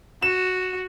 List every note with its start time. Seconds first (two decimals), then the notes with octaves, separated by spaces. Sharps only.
0.22 F#4 E7